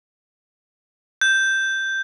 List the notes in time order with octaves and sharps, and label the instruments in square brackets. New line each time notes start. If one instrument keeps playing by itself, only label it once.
[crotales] G6